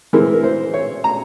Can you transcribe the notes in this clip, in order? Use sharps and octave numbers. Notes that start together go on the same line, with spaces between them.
E3 G#3 C4 A#4
A#4
C5
C#5
A#5